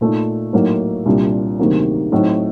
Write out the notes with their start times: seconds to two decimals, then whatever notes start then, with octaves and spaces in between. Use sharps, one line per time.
0.01 A#2 A3 D#4
0.53 A2 F#3 A#3 D#4
1.06 C2 A#2 G3 D4
1.59 D2 C3 D#3 F#3 A#3
2.12 A2 F#3 C4 D#4